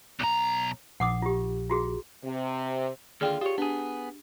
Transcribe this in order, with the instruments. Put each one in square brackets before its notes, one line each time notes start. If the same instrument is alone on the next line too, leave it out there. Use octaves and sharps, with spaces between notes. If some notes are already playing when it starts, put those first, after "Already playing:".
[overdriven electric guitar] B1 A#5
[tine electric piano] A#1 [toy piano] F#5 D6 D#6
[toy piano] F4 G4
F4 F#4 G#4
[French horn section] C3
[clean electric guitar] D#2 D3 F4 [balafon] G#4 D5 G5
[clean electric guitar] F4 C#5 [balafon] G4
[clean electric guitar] B3 G#4 [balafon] D4